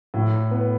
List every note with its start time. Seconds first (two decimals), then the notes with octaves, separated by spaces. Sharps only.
0.14 A2
0.51 B3